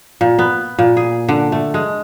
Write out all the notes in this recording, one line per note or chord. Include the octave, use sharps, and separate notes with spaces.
A#2
B3
A#2
G#4
D3
A3
G#3